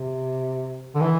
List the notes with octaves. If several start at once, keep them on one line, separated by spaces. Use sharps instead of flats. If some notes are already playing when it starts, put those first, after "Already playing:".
Already playing: C3
D3
E3